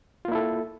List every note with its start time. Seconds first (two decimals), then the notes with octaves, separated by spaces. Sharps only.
0.25 F4
0.28 A#3
0.32 E4
0.35 A4